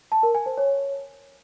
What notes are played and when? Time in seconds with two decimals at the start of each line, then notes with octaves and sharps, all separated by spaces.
0.12 A5
0.23 A#4
0.35 G#5
0.46 C5
0.58 C#5